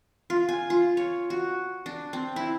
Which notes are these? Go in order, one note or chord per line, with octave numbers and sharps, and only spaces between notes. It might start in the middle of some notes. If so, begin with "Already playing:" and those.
F4
G#5
F4
C#5
F#4
D4
C4
E4